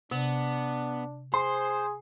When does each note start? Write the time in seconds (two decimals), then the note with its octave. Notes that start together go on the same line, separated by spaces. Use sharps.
0.11 C3 B3 D4
1.34 G#4 C5 C6